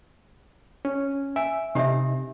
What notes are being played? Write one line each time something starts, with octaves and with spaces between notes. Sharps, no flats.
C#4
E5 G#5
C3 D#4 G4 E5